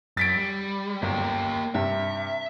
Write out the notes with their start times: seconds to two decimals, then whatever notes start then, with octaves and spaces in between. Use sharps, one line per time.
0.17 F#2 A6 B6 D7
0.36 G3
1.02 G1 F#2 A#3 G4
1.75 G2 C3 E5